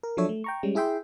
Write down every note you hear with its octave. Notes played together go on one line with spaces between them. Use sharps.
A#4
F3 F#3 D4 A4 C#5 E5
A3
G5 A#5 C#6
G3 G#3 C#4
E4 G#4 E5 G5 C6